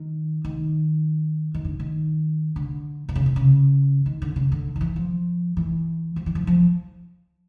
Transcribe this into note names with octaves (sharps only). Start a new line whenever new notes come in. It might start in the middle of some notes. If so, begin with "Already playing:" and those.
Already playing: D#3
D#3
D#3
D3
D#3
D3
C3
C#3
C3
C#3
D#3
D3
C#3
D3
D#3
E3
F3
E3
F3
E3
F3
F3